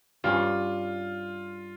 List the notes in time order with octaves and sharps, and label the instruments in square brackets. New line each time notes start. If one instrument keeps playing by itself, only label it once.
[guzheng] G2 G3 C#4 [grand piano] F4